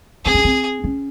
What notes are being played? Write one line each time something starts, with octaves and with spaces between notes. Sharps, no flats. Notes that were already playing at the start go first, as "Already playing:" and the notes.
C4 G#4
C#4
C4
C#4